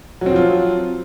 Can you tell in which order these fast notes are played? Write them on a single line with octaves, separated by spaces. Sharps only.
F#3 C4 F3 F4